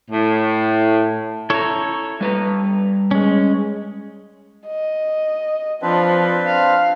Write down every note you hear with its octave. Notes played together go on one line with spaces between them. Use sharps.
A2
E4 A4 C#5 A#5
G3 B4 A#5
G#3 C#4
D#5
F3 C4 D4 B4
F5